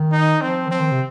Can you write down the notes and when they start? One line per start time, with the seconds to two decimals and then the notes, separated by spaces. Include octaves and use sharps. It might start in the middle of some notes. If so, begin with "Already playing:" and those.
Already playing: D#3
0.12 D#4
0.41 F3 C4
0.67 D#3
0.71 F3 C4
0.80 D#3
0.91 C3